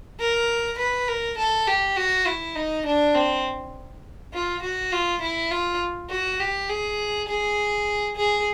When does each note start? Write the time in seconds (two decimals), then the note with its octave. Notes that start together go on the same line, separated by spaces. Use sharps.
0.20 A#4
0.79 B4
1.08 A#4
1.38 A4
1.67 G4
1.97 F#4
2.27 E4
2.56 D#4
2.86 D4
3.15 C4
4.33 F4
4.63 F#4
4.92 F4
5.22 E4
5.51 F4
6.10 F#4
6.40 G4
6.69 G#4
7.28 G#4
8.17 G#4